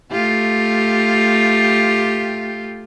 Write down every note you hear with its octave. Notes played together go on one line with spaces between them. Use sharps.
A3 F4 G4